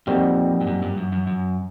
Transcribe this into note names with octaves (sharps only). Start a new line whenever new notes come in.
F2 A#2 G3 C4 D#4 F#4
G2
F#2
G2
F#2
F#2
F#2